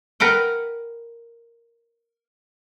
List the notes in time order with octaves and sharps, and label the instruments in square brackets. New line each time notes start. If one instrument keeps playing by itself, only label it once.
[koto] A#4 B4 F#5 G5